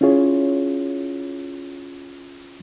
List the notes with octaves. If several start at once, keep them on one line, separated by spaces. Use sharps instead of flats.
C#4 E4 F4 G#4 C#5